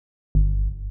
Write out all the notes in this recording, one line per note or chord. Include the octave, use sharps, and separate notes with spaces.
G1